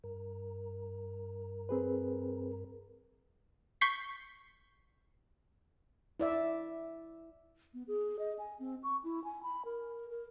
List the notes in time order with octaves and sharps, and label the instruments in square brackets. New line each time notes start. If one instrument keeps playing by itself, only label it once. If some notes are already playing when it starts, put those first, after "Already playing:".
[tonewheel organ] G2 A#4
[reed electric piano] C4 G#4 B4
[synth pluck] C#6 G6 B6 C7
[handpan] E4 D5 E5
[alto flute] B3
G#4
D#5
G#5
C4
C#6
E4
G#5
B5
A#4
A#4